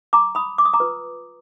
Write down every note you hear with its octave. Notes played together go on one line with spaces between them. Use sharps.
A#5 D6
B5 D#6
D6
D#6
A#5 D6
F4 B4